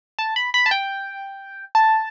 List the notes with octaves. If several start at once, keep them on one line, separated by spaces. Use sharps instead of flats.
A5
B5
B5
A5
G5
A5